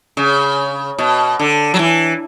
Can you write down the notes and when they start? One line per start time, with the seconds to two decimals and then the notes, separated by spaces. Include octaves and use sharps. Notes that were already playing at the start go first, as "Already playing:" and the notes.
0.17 C#3
0.99 B2
1.39 D3
1.74 F#3
1.79 E3